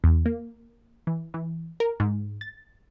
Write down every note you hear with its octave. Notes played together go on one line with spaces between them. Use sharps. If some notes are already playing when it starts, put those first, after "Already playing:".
E2
A#3
E3
E3
A#4
G#2
A6